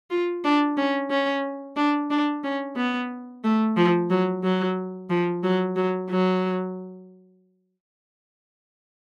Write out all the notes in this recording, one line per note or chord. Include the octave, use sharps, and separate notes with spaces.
F4
D4
C#4
C#4
D4
D4
C#4
B3
A3
F3
F#3
F#3
F3
F#3
F#3
F#3